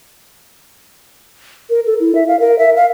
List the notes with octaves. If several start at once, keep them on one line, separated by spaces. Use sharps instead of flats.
A#4
A4
E4
E5
F5
A#4
E5
F5